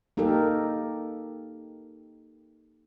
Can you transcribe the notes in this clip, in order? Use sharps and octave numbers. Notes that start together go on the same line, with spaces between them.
A#3 D#4 G4 A4 A#4